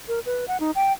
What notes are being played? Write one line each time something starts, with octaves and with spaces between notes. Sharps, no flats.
A#4
B4
F#5
D#4
G5